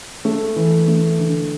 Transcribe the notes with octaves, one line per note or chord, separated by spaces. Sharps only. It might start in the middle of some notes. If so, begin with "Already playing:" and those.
A3
E3
A3
D3